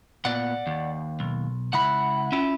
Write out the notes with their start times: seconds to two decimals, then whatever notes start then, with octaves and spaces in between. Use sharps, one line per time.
0.25 A#2 B3 D5 F#5
0.67 D#2
1.20 B1
1.73 C#2 E4 F#5 B5
2.32 C#4 E4 F4